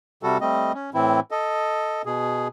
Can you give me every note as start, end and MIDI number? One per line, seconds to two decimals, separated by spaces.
0.23 0.38 48
0.23 0.38 55
0.23 0.38 66
0.23 0.38 69
0.41 0.72 55
0.41 0.72 57
0.41 0.72 60
0.41 0.72 75
0.74 0.90 61
0.94 1.20 45
0.94 1.20 52
0.94 1.20 60
0.94 1.20 64
1.31 2.02 69
1.31 2.02 75
2.06 2.48 47
2.06 2.48 68